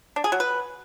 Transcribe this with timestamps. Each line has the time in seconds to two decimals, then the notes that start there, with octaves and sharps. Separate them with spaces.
0.16 D4
0.24 G#4
0.32 F#3
0.40 B4